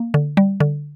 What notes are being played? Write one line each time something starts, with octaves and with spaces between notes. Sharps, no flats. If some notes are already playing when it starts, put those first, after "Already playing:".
Already playing: A#3
D3
G3
D3